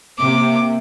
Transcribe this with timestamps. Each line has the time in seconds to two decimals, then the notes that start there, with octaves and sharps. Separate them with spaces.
0.19 C3 A#3 D6